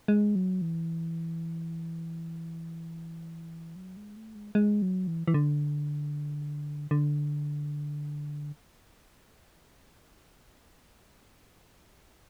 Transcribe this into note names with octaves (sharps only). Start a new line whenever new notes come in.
G#3
F#3
E3
F#3
G#3
A3
G#3
G#3
F#3
E3
E3
D3
D3